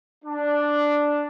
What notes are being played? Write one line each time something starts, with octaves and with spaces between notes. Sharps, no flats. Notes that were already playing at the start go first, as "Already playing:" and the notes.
D4